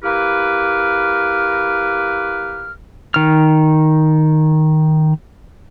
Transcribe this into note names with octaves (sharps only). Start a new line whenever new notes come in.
A#3 E4 G4 B4 D6 F6
D#3 F6